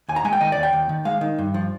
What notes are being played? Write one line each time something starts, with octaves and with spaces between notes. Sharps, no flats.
D#2 G#5
A#5
G#3 G#5
G5
D#3 D#5
D#2 D5
G5
D#2
D#3
G#3 F5
D#3
G2
F3